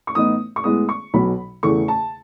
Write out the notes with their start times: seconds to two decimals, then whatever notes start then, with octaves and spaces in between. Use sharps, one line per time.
0.07 C#6
0.15 A2 E3 B3 D#4 D#6
0.56 C#6
0.64 A2 G#3 B3 E4 D#6
0.89 C#6
1.14 B1 B2 F#3 B5
1.63 E2 C#3 E3 A3 C#6
1.88 A5